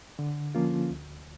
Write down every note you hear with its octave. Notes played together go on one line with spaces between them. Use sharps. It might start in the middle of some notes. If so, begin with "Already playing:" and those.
D3
F3 A#3 C#4 F4
D2